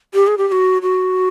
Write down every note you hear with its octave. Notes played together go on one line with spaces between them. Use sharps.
G4
G#4
G4
G4
F#4
F#4